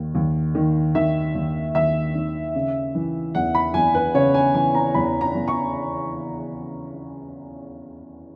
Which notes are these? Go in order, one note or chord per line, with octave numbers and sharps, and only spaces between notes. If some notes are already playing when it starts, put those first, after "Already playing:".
Already playing: D#2 D#3
D#2
D#3
D#3 E5
D#2
D#2 E5
D#3
C#3
E3
E2 F#5
B5
E2 G#5
B4
C#3 C#5
G#5
E3 G#5
A#5
E2 B5
A#5
E2
C#6